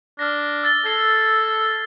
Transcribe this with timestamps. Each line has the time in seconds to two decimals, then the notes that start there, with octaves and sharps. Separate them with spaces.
0.19 D4 F6 A#6
0.63 E6 A6 G7
0.85 A4 G#6 C7 G7